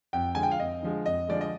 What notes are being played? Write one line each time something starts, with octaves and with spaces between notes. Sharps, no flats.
F2 G5
D3 F3 G#3 G#5
G5
F5
F2 D#5
D3 F3 G#3
F2 D#5
D3 F3 G#3 D5
D#5